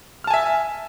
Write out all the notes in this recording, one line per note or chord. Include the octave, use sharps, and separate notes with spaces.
E5 G#5 A5 F6